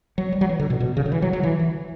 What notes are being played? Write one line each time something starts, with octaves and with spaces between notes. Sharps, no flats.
F#3
G3
F#3
E3
D3
B2
B2
C#3
D3
E3
F#3
F#3
E3
E3